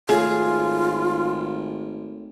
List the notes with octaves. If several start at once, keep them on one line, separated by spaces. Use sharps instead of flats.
G#1 A3 F4 G#4 A4 C#5